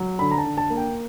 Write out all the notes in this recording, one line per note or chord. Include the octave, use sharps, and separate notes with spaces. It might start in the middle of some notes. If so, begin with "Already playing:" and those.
Already playing: F#3
D3 B5
A#5
A5
D3
A5
A#3
G5